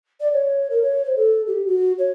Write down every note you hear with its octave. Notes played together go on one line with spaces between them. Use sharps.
D5
C#5
A#4
C#5
C5
A4
G4
F#4
C#5